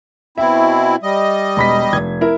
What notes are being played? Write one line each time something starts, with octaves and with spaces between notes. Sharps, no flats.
B2 C4 E4 E5
G3 D#5
E1 B5 B6
F1 G#6
E4 A#4